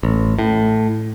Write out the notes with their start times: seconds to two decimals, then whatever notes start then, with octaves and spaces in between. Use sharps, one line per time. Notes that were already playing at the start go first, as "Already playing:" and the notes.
0.03 A1
0.39 A2